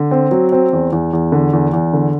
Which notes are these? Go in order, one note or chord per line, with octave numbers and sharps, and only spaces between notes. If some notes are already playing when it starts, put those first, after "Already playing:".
Already playing: D3
C4
F#3
C4
E2
E2
E2
D3
E2
E2
D3